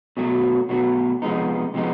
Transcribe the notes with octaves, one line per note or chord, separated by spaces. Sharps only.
B2 F#3 A3
B2 F#3 A3
C3 F3 G#3 B3 D#4
C3 F3 G#3 B3 D#4